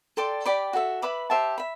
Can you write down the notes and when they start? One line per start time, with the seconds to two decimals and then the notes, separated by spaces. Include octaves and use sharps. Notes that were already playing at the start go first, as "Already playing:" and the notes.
0.17 A4 D5 G5 C6
0.45 G4 D5 G5 B5
0.73 F#4 A4 E5
1.02 B4 E5 B5 D6
1.30 G4 C5 E5 A5
1.58 E5 B5